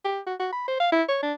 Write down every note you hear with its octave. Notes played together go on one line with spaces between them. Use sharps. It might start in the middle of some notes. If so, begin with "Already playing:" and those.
G4
F#4
F#4
B5
C5
F5
E4
C#5
D4